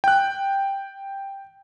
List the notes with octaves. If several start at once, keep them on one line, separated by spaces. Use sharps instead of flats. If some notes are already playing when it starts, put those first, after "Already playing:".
G5 F#6